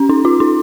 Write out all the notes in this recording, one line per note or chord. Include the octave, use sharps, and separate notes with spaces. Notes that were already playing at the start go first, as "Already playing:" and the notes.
Already playing: C#4
D#4
F4
D#4